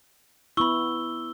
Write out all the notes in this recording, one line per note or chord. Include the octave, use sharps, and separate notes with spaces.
B3 E4 B5 C#6 E6 G7